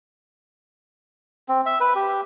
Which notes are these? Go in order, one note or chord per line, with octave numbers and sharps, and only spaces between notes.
C4
E5
B4
G4